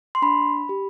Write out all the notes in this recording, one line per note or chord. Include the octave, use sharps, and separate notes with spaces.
C6
D4 B5
G4